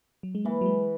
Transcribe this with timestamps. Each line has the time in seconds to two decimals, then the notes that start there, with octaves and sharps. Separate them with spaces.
0.23 F#3
0.35 G#3
0.45 E3 A#3
0.61 F#3
0.66 G#3